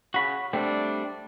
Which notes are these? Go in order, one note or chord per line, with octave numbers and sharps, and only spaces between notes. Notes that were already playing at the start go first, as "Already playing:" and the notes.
C#3 F#4 B5
G3 A3 C4 D4